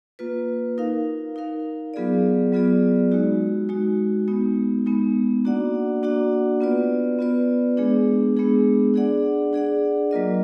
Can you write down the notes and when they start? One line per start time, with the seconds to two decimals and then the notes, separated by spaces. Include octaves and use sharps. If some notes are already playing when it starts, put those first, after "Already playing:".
0.19 A#3 F4 B4
0.78 D#4 A#4 F5
1.36 D#4 A#4 F5
1.94 F#3 B3 F4 G#4 D5
2.53 F#3 B3 F4 G#4 D5
3.12 G#3 D#4 F#4
3.69 G#3 D#4 F#4
4.28 G#3 B3 D#4
4.86 G#3 B3 D#4
5.45 A#3 D4 F#4 D5 F#5
6.03 A#3 D4 F#4 D5 F#5
6.60 B3 F4 B4 D5
7.19 B3 F4 B4 D5
7.77 G#3 B3 D4 G#4
8.37 G#3 B3 D4 G#4
8.94 D4 G#4 D5 F#5
9.53 D4 G#4 D5 F#5
10.11 F#3 A#3 F4 A#4 D#5